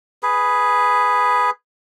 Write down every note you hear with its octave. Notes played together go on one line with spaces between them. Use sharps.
G#4 B4